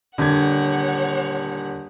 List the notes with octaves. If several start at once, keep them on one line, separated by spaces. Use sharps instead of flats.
D#1 D3 C#5 F#5 G#6